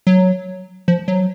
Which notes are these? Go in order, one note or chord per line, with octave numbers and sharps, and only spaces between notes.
F#3
F3
F#3